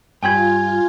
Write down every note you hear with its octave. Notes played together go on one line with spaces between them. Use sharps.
G2 F4 G5 G#5 B5 G#6